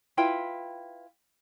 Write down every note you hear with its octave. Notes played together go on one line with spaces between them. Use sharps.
E4 F4 B4 G5